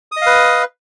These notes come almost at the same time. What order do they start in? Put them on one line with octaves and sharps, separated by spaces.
D#6 D#5 F5 B4